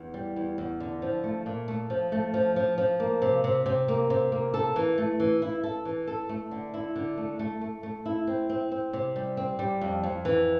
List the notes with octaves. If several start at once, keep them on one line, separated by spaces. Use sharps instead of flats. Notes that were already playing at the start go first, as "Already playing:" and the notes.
Already playing: E2
G3
E2
E2
D3
F3
A3
A#2
A3
F3
A3
F3
F3
F3
A#3
C3
C3
C3
A#3
C3
A#3
A4
E3
A3
E3
E4
A4
E3
A4
A3
D3
E4
D3
A3
A3
A3
A3
E4
C4
C4
C4
C3
G3
C4
G3
F2
F2
E3